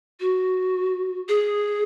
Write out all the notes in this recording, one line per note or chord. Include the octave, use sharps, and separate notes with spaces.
F#4
G#4